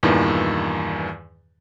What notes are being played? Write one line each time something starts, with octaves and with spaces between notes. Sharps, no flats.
E2 G2 A#2 D#3 E3